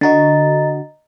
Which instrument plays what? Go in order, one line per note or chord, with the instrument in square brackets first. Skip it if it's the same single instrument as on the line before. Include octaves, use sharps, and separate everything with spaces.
[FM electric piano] D3 F#4 [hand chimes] D#5 A#5 A6